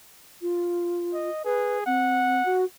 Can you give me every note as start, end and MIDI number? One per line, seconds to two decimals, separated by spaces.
0.42 1.30 65
1.14 1.43 75
1.45 1.85 68
1.45 1.78 71
1.86 2.42 60
1.86 2.64 78
2.45 2.65 66